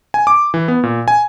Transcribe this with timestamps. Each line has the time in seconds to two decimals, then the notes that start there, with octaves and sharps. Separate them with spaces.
0.14 G#5
0.27 D6
0.54 E3
0.68 B3
0.83 A#2
1.08 G#5